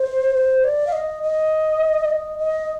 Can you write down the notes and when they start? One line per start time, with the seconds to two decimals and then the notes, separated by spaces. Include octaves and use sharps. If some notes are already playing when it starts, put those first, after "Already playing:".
Already playing: C5
0.35 C5
0.64 D5
0.87 F5
0.92 D#5
1.23 D#5
2.05 D5
2.10 D#5
2.38 D#5